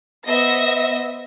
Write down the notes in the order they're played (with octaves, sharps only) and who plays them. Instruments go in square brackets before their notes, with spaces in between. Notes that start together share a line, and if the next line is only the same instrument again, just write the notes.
[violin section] B3 C5 D#5 E5 A#6